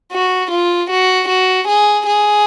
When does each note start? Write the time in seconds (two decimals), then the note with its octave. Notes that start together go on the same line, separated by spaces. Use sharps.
0.12 F#4
0.51 F4
0.90 F#4
1.28 F#4
1.68 G#4
2.06 G#4